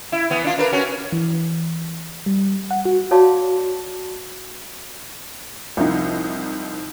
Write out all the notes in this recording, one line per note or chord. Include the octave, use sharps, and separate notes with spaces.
E4
E3 B3
D4 F4
D4 A#4 B4
C#4 F#4
E3
G3
F#5
F#4
F#4 C#5 D5 F5 A5 D6
C2 F3 C4 D#4